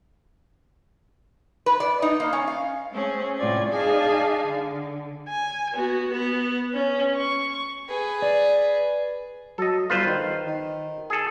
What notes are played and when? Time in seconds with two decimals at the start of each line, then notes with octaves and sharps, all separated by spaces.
1.66 B4
1.80 D5
2.02 D#4
2.20 A#3
2.33 C#4
2.48 F5
2.92 A3 C4 C#4 G#4
3.38 A2 C3 F4 D5 G#6
3.70 D#4 G#4 D5 F5 G#5 A5
4.45 D3
5.29 G#5
5.74 B3 F#4
6.11 B3 B4
6.74 C#4
7.16 C#6
7.89 G#4 B4
8.22 D5
9.58 F#3 A4 D#5
9.90 G1 F4 B4 C5
10.06 D#3
10.46 D#3
11.10 G#4 A4